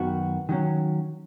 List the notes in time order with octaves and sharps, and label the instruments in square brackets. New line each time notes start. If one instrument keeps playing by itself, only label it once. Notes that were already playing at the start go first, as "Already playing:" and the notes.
Already playing: [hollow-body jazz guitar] F#2 D#3 B3 F#4
D#3 F#3 C#4